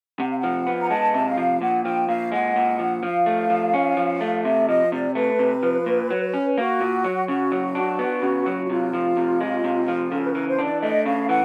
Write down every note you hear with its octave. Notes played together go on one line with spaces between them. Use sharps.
C3 F#5
F5
F#5
F3
B3
A#5
G#3 A5
C3 E5
F5
F3
A#2 F#5
F3 G5
A#2 F5
G#3 F#5
A#2
F3
F3 F5
A3
F3
C#4
F3
A3
C3 E5
F3 D#5
C3 D5
A3 B4
C3
F3
A#2
F#3
C#4
A#3 F#4
A#2
F#3
C#3 F#4
F#3
D4
B3
C#3
F#3
F#4
C3 F4
F3
C3
G#3
C3
F3
C#3 A4
B4
A#4
E3
C5
D4
D5
A3 D#5
C#3 F5
E3 F#5